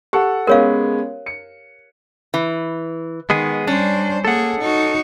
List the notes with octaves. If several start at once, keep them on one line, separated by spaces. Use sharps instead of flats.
G4 A4 F#5
G#3 B3 C#4 A#4 C#5 F5
C#7
E3
D#3 G#3 B3 G#4
G3 C#4 D4 C5
A#3 G#4 A4 F#5
D#4 F#4